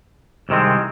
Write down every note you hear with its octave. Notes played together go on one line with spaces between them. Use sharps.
C2 C3 D#3 G#3 C4